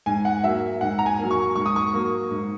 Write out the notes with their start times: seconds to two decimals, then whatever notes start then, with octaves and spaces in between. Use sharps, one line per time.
0.06 G#2 G#5
0.25 F#5
0.44 F#3 A#3 E5
0.81 G#2 F#5
0.99 A#5
1.06 G#5
1.19 F#3 A#3
1.31 C#6
1.56 G#2 C#6
1.66 D#6
1.76 C#6
1.94 F#3 A#3
2.31 G#2